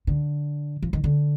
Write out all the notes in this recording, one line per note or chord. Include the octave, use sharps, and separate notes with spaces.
D3
F3
D#3
D3